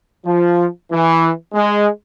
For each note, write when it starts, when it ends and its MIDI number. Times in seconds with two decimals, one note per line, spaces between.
0.26 0.66 53
0.92 1.30 52
1.54 1.87 56